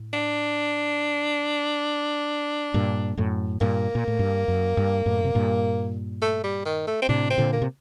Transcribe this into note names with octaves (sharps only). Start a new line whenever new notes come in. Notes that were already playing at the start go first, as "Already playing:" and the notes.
Already playing: A2
D4
G2 A#2
F#2 A2
G2 A#2 A#3
A#2
A2
G2
F#2
G2
F#2 A2
C3
G2 A#2
A3
G3
D#3
A3
C4
A2 C3 D4
C4
A#2 D3
A#3
C3